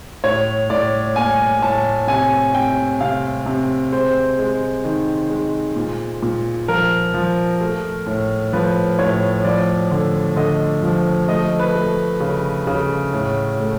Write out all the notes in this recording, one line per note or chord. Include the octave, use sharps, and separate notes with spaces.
A2 C#5
A2 D5
A#3 G#5
A2 A5
C3 G#5
C3 G5
C3 F5
C3
G#3 C5
G#3
D#3
G#3
A#2
A#2
F3 A#4
F3
A3
A2
F3 B4
A2 C#5
F3 D5
D3
D3 D#5
F3
A3 D#5
B4
A3
C#3
C#3
A2
A3